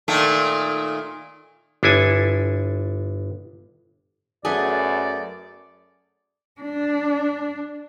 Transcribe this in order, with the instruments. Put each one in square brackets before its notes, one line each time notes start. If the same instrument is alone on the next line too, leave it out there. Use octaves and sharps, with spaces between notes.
[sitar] A#2 D#3 A3
[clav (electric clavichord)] G1 D4 E4 A4 G#5
[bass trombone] F#2 [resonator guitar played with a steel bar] A3 B3 G#4 [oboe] D5
[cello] D4